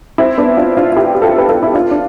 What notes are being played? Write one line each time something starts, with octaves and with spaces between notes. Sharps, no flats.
C4 E4
B3 D4
D4 F4
D4 F4
F4
E4 G4
G4
F4 A4
B4
F4 A4
E4
D4 F4
D4